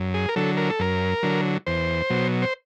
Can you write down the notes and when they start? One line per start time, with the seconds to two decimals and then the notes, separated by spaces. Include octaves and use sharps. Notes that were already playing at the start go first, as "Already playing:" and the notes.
Already playing: F#2
0.14 G#4
0.29 A#4
0.36 D3 F#3 A4
0.57 A#4
0.70 A4
0.79 F#2 A#4
1.23 D3 F#3
1.67 E2 C5
2.10 B2 F#3
2.42 C5